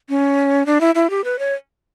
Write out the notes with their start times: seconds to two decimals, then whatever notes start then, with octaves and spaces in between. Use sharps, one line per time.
0.09 C#4
0.66 D4
0.81 E4
0.95 E4
1.10 G4
1.24 B4
1.39 C#5